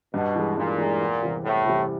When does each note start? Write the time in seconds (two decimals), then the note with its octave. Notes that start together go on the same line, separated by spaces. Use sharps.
0.14 G2 B2
0.36 E3 G#3
0.57 G2 A#2
0.78 E3 G#3
1.01 E2
1.23 C3 E3 G3
1.44 E2 A2
1.65 C3 E3 G3